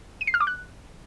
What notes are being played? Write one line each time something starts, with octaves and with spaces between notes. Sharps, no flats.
D#7
C7
F6
D6
F#6